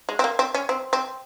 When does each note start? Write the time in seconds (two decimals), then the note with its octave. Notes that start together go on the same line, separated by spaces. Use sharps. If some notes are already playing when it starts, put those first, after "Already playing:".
0.09 G#3
0.19 C4
0.24 A#3
0.39 C4
0.54 C#4
0.69 C4
0.93 C4